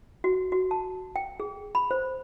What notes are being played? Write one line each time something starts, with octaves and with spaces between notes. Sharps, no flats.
F#4
F#4
A5
G5
G#4
B5
C5